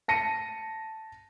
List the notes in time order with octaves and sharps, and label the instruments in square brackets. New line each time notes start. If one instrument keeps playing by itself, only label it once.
[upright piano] A5 A#6 C#7 D#7